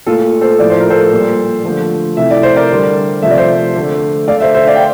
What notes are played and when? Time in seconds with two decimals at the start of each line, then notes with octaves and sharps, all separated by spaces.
0.06 A#2 F4 A4
0.10 A3
0.41 A4 C5
0.59 A2 F3 A3 D5
0.70 C5
0.80 A#4
0.90 A4 C5
1.12 A#2 G3
1.64 D3 F3 A3
2.17 C3 E3 A3 E5
2.31 D5
2.43 C5
2.56 A#4 D5
2.70 D3 G3
3.22 C3 F3 A3 E5
3.30 D5
3.37 C5 E5
3.76 D3 A3
4.28 D3 A3 D5 F5
4.41 C5 E5
4.54 C5 E5
4.67 D5 F5
4.75 G5